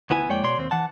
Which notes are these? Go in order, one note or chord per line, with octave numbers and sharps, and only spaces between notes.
D2 B3 E4 G#5
F2 G#3 A#3 C#5 D5 G5
B2 C#5 D5 C6
D#2 C4
E3 F#5 A5